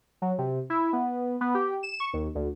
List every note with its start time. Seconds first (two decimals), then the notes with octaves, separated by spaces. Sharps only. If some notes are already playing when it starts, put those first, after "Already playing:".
0.22 F#3
0.38 C3
0.70 E4
0.93 B3
1.41 B3
1.54 G4
1.83 E7
2.00 C#6
2.13 D#2
2.35 D2